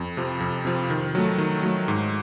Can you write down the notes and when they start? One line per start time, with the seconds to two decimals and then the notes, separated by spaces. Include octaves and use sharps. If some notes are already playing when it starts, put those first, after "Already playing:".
Already playing: F2
0.17 C3 F3
0.40 F2
0.65 C3 F3
0.90 D#3
1.15 F#3 A3
1.38 D#3
1.63 F#3 A3
1.88 G#2